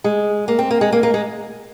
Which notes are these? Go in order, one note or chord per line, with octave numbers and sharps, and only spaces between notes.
G#3
A#3
C4
A#3
G#3
A#3
A#3
G#3